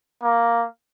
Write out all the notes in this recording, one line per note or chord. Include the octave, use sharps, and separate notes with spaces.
A#3